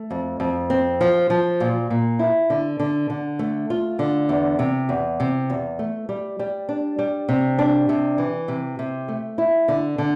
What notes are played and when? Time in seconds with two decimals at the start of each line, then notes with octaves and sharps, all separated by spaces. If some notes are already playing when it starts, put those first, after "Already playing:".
Already playing: A3
0.11 F2
0.40 F2
0.70 C4
1.01 F3
1.30 F3
1.60 A#2
1.90 A#2
2.19 E4
2.50 D3
2.80 D3
3.10 D3
3.39 A3
3.70 F4
3.99 D3
4.29 E2
4.59 C3
4.89 E2
5.20 C3
5.50 E2
5.79 A3
6.09 G3
6.39 G3
6.69 D4
6.99 G3
7.29 C3
7.59 D4
7.89 C3
8.18 E3
8.48 C3
8.79 C3
9.08 A3
9.38 E4
9.68 D3
9.98 D3